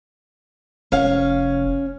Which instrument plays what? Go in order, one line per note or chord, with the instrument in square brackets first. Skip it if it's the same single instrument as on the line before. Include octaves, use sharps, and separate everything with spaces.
[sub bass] F1 [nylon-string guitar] C#4 F5